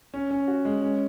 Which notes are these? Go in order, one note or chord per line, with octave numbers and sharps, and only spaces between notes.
C#4
C#4
F#4
G#3
C#4